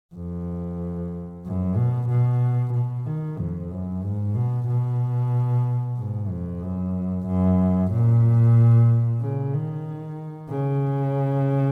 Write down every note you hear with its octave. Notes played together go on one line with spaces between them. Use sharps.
F2
F#2
B2
B2
B2
D#3
F2
F#2
G#2
B2
B2
G#2
F2
F#2
F#2
A#2
C#3
D#3
C#3